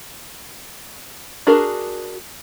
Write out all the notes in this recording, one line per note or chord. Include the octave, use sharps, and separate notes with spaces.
D4 F#4 G#4 A#4